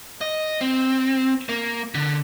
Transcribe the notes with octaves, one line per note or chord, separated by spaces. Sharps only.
D#5
C4
A#3
D3